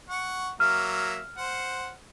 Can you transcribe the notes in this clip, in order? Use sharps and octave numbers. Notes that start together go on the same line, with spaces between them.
F#5 C#6
F#3 A#3 E5 F6
C5 F#5